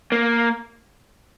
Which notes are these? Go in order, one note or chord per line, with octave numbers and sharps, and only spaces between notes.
A#3